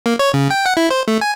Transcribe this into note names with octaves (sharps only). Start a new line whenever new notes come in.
A#3
C#5
C#3
G5
F#5
E4
C5
A3
G#5